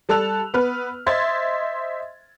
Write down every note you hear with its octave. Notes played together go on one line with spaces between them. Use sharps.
G3 A4 A5 E6 F#6 F7
B3 B4 F6
C5 D#5 E5 C6 G#6 A6